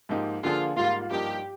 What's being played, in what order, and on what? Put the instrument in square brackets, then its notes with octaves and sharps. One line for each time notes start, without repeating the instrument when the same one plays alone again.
[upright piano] G#2 F3 A#3 D#4 G4
[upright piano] D3 F3 A#3 D4 G#4 [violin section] F4
[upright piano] G#2 G3 A#3 [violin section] F4
[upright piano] G2 F3 A#3 D#4 A#4 [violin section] G4